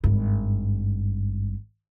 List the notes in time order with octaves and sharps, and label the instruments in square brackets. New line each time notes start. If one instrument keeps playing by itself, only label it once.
[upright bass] G#1 G2